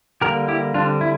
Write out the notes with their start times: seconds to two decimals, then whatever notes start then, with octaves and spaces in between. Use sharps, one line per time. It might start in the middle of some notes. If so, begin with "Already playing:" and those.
0.21 D3 G3 A#3 G4 A#4
0.48 E4 G4
0.74 D3 G3 C4 D4 F4
1.01 E4